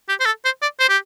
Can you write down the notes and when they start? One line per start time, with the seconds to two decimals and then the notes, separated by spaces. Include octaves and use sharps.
0.09 G4
0.20 C5
0.25 A4
0.45 C5
0.62 D5
0.80 C5
0.89 G4